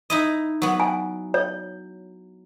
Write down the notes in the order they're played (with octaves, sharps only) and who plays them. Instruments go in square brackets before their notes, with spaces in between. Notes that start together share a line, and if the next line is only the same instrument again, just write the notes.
[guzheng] D#4 E4 D#5
F#3 B3
[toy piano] G#5
C#5